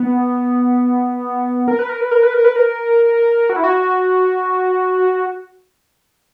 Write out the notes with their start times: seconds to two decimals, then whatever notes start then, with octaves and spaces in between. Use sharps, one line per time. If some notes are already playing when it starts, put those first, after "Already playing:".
Already playing: B3
1.68 A#4
1.79 B4
1.89 A#4
2.01 B4
2.11 A#4
2.23 B4
2.34 A#4
2.45 B4
2.56 A#4
3.50 F#4
3.56 E4
3.64 F#4